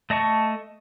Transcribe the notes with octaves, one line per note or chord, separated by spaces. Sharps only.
A3 D#5 A5 C#6